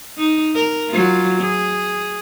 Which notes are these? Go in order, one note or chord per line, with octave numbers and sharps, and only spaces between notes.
D#4
A#4
F#3 F4
G#4